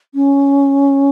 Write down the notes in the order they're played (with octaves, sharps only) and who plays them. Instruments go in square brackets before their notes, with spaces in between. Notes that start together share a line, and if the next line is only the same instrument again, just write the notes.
[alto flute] C#4